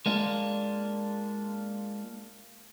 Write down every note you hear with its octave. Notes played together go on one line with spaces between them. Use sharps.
G#3 A#3 D4 F4